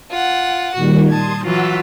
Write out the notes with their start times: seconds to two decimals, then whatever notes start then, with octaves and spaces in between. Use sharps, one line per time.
0.10 F4 F#5
0.75 A#2 D#3 G3 F#4
1.09 A5 C6 D#6 G#6
1.44 E3 F#3 F4 F#5 E6 B6